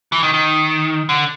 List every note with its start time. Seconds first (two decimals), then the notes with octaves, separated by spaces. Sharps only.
0.12 E3
0.23 D#3
0.34 D#3
1.09 D3